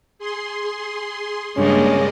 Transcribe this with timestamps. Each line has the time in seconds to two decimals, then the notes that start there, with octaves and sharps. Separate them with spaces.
0.19 G#4 C6
1.57 G2 C#3 G#3 A#3 C#4 D4 D5 D#5